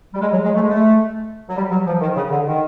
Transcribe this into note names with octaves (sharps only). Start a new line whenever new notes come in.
G3
G#3
F#3
G#3
A3
G#3
A3
F#3
G3
F#3
F3
D#3
C#3
D3
D#3